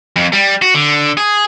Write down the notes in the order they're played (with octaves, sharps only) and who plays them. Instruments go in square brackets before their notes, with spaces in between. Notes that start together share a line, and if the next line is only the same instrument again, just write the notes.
[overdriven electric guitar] F2
G3
F#4
D3
G#4